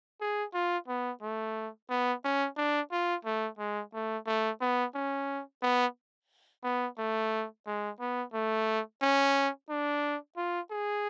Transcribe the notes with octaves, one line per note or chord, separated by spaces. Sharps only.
G#4
F4
B3
A3
B3
C#4
D4
F4
A3
G#3
A3
A3
B3
C#4
B3
B3
A3
G#3
B3
A3
C#4
D4
F4
G#4